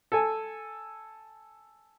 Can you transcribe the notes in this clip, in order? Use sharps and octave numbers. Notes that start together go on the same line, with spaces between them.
A4 G#5